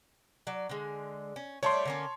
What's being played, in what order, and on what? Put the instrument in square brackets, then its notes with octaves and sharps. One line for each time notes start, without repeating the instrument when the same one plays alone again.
[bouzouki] F#3 D5
D3 G#3
C#4
[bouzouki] G3 A3 D4 [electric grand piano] C#5 A5 C6
[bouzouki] D3 A#3 C#4